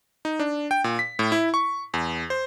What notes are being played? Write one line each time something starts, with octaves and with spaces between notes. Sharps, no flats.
D#4
D4
G5
A#2
B6
A2
E4
C#6
E2
C5